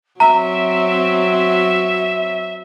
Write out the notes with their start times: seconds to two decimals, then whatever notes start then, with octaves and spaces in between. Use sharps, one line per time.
0.20 F#3 C4 E5 A#5